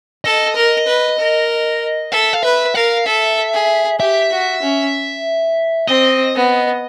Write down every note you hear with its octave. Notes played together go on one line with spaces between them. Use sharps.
A4 D#5
A#4
B4
A#4
A4 E5
F5
B4 E5
A#4 F5
A4 E5
G#4
G4 E5
F#4
C#4
C4 D#5
B3